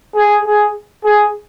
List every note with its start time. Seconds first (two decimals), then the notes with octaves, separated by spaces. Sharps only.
0.15 G#4
0.46 G#4
1.05 G#4